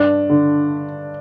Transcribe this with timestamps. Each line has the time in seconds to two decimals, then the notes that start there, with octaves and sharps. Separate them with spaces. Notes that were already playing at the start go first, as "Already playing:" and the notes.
Already playing: G2 D4
0.30 D3